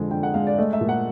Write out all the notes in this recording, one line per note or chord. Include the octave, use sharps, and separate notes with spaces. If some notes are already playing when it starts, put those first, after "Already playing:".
Already playing: F2 D3 F3 G#3
D3 G5
F#5
G#3 F5
D5
A3 D#5
E5
A#2
F#5